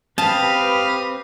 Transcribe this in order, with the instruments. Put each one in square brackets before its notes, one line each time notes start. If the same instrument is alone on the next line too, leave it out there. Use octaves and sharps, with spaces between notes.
[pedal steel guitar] C4 [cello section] G4 B4 [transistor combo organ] F5 D#6 [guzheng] A5